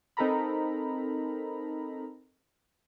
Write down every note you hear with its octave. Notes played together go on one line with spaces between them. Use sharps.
C4 D#4 A4 A#4 A#5 B5